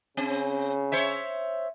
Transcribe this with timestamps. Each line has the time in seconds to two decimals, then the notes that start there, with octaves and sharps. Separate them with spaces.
0.17 C#3 C4
0.92 C5 C#5 E5